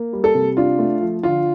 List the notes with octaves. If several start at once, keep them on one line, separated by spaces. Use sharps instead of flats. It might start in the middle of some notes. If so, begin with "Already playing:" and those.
Already playing: A#3
G3
A4
C3
D4 F4
A3
F3
D3 F4